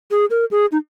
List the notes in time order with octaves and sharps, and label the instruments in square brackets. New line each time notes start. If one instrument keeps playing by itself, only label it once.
[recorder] G#4
A#4
G#4
D#4